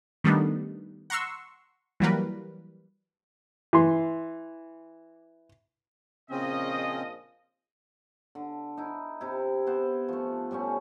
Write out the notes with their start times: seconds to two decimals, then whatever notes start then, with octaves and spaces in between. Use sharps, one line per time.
0.24 D#3 G3 A3 B3 D4 D#4
1.10 F#5 A#5 C6 C#6 E6
2.00 E3 F#3 G3 A#3 A#4 B4
3.73 E3 C6
6.31 A#1 C#3 F3 C4 C#4 D#5
8.35 D3
8.77 D#4 E4
9.21 C3 E4
9.67 B3 C5
10.08 F3 A3
10.51 A2 G3 A3 C#4